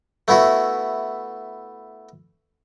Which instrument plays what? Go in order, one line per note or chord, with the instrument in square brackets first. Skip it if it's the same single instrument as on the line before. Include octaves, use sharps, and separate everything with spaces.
[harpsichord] A3 B3 E4 F#4